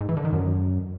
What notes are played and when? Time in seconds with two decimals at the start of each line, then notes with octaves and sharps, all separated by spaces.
0.01 G#2
0.09 E3
0.17 D3
0.25 D#3
0.33 F#2